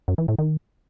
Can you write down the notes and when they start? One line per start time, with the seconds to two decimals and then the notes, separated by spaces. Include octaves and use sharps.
0.08 F#2
0.18 E3
0.28 A2
0.39 D#3